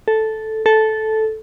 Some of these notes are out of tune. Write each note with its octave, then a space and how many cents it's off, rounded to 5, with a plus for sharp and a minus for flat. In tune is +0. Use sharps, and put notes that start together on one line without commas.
A4 -5
A4 -10